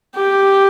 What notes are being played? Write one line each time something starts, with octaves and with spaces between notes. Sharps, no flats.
G4